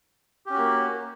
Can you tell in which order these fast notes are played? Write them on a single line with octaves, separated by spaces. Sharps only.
G4 C#4 F#4 A#3